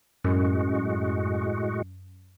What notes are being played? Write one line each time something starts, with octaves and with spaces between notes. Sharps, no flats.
F#2 A2 G#3 F#4